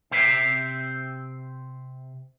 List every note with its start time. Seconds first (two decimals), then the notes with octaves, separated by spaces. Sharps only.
0.11 C3 C4 C5 E5